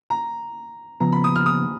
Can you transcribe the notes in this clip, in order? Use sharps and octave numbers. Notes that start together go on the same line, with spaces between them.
A#5
C#3 F3 B3 A#5
B5
D#6
F6
D#6